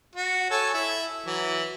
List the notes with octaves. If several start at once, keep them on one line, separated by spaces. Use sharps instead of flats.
F#4
A4 C#5 G#5
E4 E5
E3 F#3